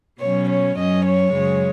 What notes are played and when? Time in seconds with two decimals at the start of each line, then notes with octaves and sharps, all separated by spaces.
0.20 B2 F#3 C#4 C#5
0.48 C#5
0.77 F#2 F#3 C#4 D#5
1.05 C#5
1.33 F#2 C#3 G#3